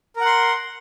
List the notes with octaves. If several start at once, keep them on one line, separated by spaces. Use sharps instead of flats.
A#4 F#5 C6